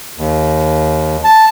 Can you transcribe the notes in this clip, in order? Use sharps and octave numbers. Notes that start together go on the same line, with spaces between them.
D#2
A5